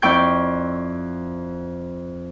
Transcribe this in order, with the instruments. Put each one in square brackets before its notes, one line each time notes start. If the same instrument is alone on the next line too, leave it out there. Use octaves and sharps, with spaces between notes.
[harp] F2 E4 D5 G5 C#6 G6